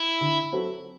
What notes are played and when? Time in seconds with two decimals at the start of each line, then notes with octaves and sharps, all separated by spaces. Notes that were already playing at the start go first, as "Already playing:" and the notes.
Already playing: E4
0.21 D3
0.52 F#3 C4 F#4 A4